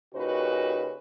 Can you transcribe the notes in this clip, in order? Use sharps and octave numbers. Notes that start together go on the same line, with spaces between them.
A#2 C#3 D#4 F#4 G4 B4